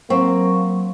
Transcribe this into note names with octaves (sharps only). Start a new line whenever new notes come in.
F#3 A#3 C4 C#6